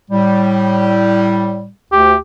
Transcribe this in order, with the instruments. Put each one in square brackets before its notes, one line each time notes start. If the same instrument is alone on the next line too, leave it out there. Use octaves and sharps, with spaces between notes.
[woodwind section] A2 G3
[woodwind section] D2 [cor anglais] G4